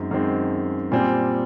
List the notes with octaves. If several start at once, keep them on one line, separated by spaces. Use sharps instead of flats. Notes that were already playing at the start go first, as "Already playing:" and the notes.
Already playing: F#2 D#3 G#3 C4
F#2 D#3 G#3 C4
A#2 G3 C4 G#5